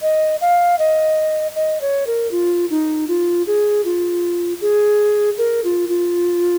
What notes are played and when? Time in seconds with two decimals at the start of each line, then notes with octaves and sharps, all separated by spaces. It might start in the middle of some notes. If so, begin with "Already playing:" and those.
0.02 D#5
0.41 F5
0.79 D#5
1.55 D#5
1.81 C#5
2.07 A#4
2.31 F4
2.70 D#4
3.08 F4
3.47 G#4
3.85 F4
4.61 G#4
5.38 A#4
5.64 F4
5.89 F4